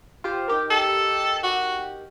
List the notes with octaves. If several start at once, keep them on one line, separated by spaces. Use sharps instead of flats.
F4 G4 C5
D#4 G4 A#4
A4
F#4